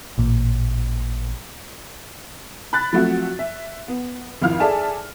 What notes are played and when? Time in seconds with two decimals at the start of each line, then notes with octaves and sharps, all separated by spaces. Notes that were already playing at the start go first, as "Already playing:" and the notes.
0.18 A1 A#2
2.73 B5 F#6 A6
2.93 F3 F#3 A3 C4 F#4
3.39 E5
3.88 B3
4.42 G#1 F2 E4 F5 F6
4.60 G#4 A4 D5 E5 G#5 A5